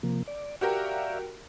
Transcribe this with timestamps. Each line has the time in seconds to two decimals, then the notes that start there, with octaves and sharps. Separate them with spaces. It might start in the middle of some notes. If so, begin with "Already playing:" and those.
0.03 C3 F3 A#3
0.28 D5
0.61 F#4 G4 A#4 D5 E5 F5